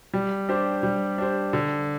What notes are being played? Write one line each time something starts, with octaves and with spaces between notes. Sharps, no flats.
G3
D4 G4 C5
G3
D4 G4 C5
D3